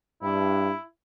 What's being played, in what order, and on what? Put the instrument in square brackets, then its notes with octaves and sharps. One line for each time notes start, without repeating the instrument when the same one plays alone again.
[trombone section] G2 [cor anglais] E4